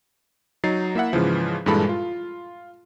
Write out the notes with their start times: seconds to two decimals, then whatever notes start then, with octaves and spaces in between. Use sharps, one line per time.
0.64 F#3 D#4 A6 C7
0.95 A#3 E4 E5 F#5
1.13 G#2 C#3 E3 F3
1.66 G2 A#2 E3 G#3 A4 B5
1.89 F4